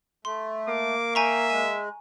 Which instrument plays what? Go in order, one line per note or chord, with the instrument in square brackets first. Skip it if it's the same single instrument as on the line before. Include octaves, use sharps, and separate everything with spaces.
[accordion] A3 [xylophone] C6
[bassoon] A#3 [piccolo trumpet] D6
[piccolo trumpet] E5 [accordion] G5 [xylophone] G#5 A#5 C#6
[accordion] G#3 [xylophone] G#5